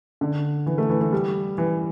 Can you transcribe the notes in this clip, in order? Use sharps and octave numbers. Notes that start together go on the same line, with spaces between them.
D3
E3
A3
E3
E3
G3
E3